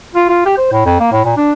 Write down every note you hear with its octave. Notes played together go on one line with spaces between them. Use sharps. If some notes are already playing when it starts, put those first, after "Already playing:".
F4
F4
G4
C5
A2
F2
A#3
A2
A#2
D4